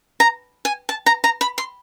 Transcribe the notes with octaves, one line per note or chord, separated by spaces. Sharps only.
A#5
G#5
A5
A#5
A#5
B5
C6